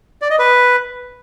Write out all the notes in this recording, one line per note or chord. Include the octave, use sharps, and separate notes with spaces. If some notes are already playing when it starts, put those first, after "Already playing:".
D5
D#5
B4